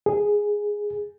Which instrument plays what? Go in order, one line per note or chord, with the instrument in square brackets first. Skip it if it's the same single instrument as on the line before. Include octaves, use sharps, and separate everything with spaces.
[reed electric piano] G#4